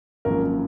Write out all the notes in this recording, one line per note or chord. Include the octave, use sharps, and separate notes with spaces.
G#1 F#2 F3 A#3 A#4